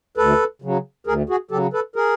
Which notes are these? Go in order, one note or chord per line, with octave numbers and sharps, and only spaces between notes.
D2 A4 B4
C#3 F#3
D2 G#4 A#4
F#4 G#4
C#3 F#3 G4 A4
A4 B4
G#4 A#4